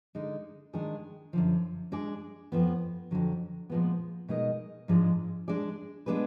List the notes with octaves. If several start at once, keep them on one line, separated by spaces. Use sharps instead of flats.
D3 G#3 D#4
D#3 G#3 D4 G#4
F#2 D3 F3
G#3 D4 G#4 D5
F2 F3 B3
F2 D3 F#3
A#2 F3 G#3 B3
B2 G#3 D#4 A#4 D#5
G#2 F3 G#3 D4
G#3 D4 G#4 D5
G#3 B3 D4 G#4 B4